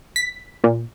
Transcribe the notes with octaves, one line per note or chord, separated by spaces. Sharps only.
B6
A#2